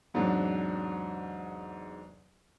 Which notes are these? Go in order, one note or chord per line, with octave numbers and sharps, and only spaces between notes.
E2 G#2 C3 F#3 D4